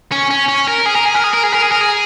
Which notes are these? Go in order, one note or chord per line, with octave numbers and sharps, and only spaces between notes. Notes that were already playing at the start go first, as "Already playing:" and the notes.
C#4
C#4
C#4
A#4
G#4
A#4
G#4
A#4
G#4
A#4
G#4
A#4
G#4
A#4
G#4